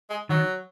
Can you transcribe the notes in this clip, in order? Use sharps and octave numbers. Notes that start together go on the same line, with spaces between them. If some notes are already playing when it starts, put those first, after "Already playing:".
G#3
D#3 F#3